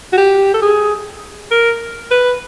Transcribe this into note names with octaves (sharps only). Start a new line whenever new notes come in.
F#4
G4
A4
G#4
A#4
B4